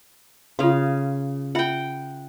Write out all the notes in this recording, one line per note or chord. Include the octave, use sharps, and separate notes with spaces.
C#3 F4 A4 F5 C6
F4 E5 F#5 G5 B5